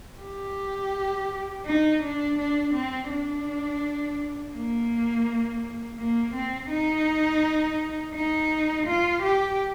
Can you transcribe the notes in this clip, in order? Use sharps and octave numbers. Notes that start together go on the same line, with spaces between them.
G4
D#4
D4
D4
C4
D4
A#3
A#3
C4
D#4
D#4
F4
G4